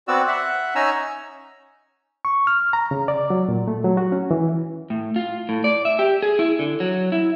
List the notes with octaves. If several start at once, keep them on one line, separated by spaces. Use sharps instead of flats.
B3 C4 F#4 D5 E6
E5 F#5
C#4 D#4 G#5 A#5 E6
C#6
F6
A#5
C#3
D5
F#3
A#2
A3
F#3
F#4
C#4
E3
A2
F4
A2
D5
E5
G4
G#4
E4
D3
F#3
E4